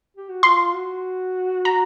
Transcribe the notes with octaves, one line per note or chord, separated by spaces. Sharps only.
G4
F#4
F4 C6
F#4
A#5